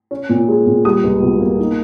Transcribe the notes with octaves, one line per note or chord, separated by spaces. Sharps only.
C#4
A#2
G#3
A#2
G3 D#6
C#2
B2
A#3
D#4